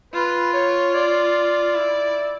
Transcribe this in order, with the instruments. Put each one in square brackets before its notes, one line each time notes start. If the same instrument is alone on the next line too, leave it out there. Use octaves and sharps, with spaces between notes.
[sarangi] F4 [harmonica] B4
[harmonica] C#5
D5
[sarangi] E4